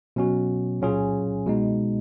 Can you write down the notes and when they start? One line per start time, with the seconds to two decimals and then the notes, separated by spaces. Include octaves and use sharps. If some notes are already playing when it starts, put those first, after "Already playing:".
0.16 B2 F#3 C#4 F#4
0.81 A#2 F#3 C#4 F4 G#4
1.46 B2 G#3 D#4